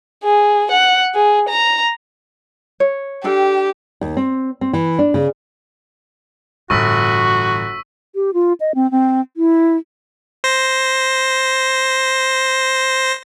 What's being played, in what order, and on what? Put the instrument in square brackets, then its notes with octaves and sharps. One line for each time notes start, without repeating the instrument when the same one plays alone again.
[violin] G#4
F#5
G#4
A#5
[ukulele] C#5
[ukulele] D4 A4 G5 [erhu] G4
[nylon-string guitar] D#2
C4
C4
E3
D4
C#3
[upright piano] G1 [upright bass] A2 E3 [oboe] F#4 [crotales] C#6 E6 B6
[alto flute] G4
F4
D#5
C4
C4
E4
[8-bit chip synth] C5 A#6